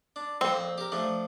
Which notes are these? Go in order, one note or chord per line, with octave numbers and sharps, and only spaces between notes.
D4
F2 A#2 C4
G4 A#4
F3 A3 D4